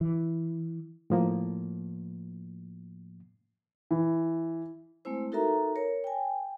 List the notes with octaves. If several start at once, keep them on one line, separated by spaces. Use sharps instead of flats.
E3
A2 F3 A#3
E3
G#3 A3 C4 E4 C5
D#4 F#4 A4 A#4 E5 A#5
A#4 C#5
G5 G#5